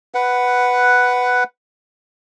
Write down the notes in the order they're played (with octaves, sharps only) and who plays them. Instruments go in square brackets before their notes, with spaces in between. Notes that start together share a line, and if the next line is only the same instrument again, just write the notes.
[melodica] B4 F#5